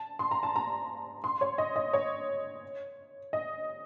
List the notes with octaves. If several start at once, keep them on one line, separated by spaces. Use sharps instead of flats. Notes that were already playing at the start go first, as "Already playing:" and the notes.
Already playing: A5
C6
A#5
A5
A#5
C6
C#5
D#5
D#5
C#5
D#5